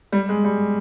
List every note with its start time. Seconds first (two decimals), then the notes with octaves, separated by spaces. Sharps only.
0.12 G3
0.29 G#3
0.44 G3